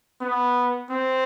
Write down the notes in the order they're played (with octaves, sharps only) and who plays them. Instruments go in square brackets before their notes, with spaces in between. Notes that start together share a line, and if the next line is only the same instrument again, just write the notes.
[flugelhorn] B3
C4